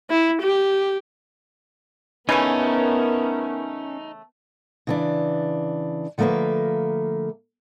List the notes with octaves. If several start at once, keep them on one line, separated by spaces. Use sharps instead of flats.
E4
G4
C#3 E3 A3 B3 C#4 D#4 A#4
C#3 E3 D4
D3 F3 A3 A#3 A#4 B4